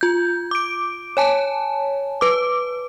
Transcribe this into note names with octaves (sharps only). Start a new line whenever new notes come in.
F4 G6
D6 D7
C#5 G#5 A5
B4 D6